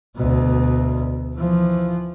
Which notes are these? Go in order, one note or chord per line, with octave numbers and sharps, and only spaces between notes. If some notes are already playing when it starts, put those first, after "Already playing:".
D2 B2
E3 F3